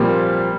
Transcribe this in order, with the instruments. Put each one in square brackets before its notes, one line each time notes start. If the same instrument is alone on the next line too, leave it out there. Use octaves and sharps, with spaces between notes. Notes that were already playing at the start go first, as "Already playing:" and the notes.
Already playing: [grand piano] A#2 F3 C4 G4 [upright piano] G3 A#3